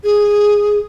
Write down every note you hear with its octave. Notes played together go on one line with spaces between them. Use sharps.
G#4